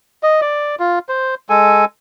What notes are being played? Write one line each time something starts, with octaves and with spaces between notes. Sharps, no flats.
D#5
D5
F4
C5
G#3 A4 G#5